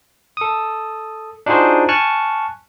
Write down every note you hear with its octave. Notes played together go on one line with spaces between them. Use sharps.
A4 D#6
D4 D#4 F4 F#4 G#4 C5
G#5 A5 C#6 F6 F#6